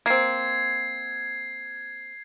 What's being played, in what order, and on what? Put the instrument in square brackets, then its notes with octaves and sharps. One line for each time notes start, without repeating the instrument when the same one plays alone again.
[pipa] A#3 C4 [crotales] G#6 C7